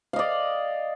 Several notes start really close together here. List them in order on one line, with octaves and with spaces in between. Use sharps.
F5 D#5 D5